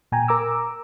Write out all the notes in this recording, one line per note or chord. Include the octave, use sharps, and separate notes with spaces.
A#2 G5 G#5 A#5
A#4 A#5 D6 E6